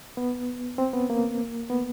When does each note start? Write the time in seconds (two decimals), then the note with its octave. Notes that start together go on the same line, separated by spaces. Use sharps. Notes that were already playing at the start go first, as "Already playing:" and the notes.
0.17 B3
0.78 C4
0.93 B3
1.10 A#3
1.70 B3